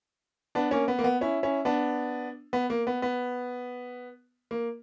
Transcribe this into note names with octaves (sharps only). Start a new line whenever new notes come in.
B3 D4
A#3 C#4
B3
A#3
B3
C#4 E4
C#4 E4
B3 D4
B3
A#3
B3
B3
A#3